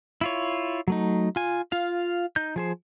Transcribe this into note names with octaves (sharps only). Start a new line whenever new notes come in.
E4 F4 C#5
F#3 A3 D#4
F4 G#5
F4 F5
D#4 G6
F3 G#4 C5